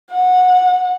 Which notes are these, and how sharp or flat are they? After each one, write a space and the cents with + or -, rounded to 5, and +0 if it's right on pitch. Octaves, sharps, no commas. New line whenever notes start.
F#5 -20